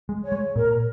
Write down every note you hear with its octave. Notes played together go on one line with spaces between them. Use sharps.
G#3
C#5
G#3
A#2 A#4